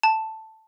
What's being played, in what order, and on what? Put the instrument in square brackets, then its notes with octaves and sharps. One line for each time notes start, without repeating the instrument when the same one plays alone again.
[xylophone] A5